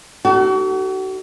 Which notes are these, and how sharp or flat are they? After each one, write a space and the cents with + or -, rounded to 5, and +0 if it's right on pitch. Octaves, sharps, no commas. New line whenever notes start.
D#4 -25 F#4 +40 A4 +0